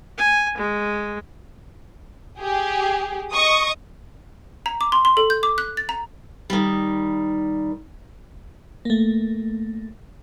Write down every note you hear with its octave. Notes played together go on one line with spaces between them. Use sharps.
G#5
G#3
G4 G#4
D#5 C#6 D#6
A#5
D6
C6
C6
A4
G6
D6
F#6
A6
A#5
D#3 G3
A3 A#3